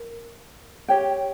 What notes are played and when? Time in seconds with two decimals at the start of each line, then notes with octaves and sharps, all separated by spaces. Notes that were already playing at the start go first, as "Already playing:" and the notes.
Already playing: A#4
0.88 G4 C#5 G5